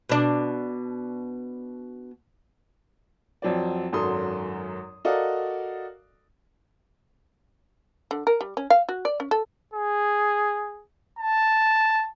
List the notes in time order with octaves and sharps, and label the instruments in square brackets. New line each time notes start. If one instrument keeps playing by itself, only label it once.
[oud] B2 D4
[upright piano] F2 F#3 C4 D5
G#1 F#2 F#3 A4 C6 D#6
F#4 A4 A#4 D5 D#5 F5
[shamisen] D3
A#4
G3
C#4
F5
F#4
D5
C#4
A4
[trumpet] G#4
A5